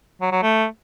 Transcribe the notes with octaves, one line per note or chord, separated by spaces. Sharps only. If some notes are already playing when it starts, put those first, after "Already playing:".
F#3
F#3
A3